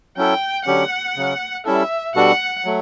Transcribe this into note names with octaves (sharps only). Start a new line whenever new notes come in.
F#3 C#4 E4 A4 G5
D3 F#3 C#4 G4 F#5
C#3 F#3 C#4
G3 C#4 E4 A4 E5
B2 G3 D4 F#4 A4 F#5
F#3 A3